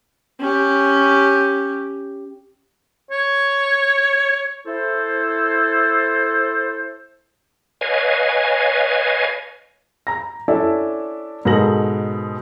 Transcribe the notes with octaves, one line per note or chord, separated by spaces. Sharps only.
C#4 G4
C#5
E4 A4 C5
B4 C#5 D#5 F5 G#5
A#5 A#6
C#4 D4 E4 A4 D5 E5
G#2 B2 A4 A#4 A#6 F#7